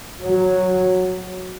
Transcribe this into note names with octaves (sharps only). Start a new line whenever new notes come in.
F#3